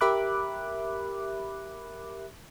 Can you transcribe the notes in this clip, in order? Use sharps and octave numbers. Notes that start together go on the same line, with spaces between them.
G4 A#4 E5 B5 D6 F#6